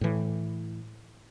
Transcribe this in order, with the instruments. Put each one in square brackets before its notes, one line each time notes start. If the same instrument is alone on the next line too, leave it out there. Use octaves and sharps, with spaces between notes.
[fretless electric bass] A2 E3